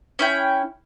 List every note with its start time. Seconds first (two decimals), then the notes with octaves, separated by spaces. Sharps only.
0.19 C#4 E4 G5